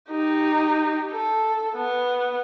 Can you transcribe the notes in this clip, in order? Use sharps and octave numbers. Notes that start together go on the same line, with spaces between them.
D#4 G4
A4
B3